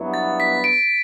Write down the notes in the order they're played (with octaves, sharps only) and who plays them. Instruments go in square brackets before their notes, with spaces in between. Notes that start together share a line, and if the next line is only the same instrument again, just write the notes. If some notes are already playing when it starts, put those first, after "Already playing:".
Already playing: [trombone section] G2 F#3 B3 E4
[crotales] A6
B6
D7